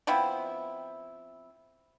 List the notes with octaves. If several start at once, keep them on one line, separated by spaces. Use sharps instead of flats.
F3 B3 C4 E4